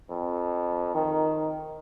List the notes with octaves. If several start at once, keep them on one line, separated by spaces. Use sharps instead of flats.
F2
D#3